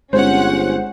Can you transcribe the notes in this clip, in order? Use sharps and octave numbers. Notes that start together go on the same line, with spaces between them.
G1 G#3 C4 C#4 G#4 C5 F#5